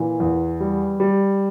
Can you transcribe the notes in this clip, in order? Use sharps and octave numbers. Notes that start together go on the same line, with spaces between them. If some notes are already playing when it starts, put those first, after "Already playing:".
Already playing: A#2 E3
E2
G3
G3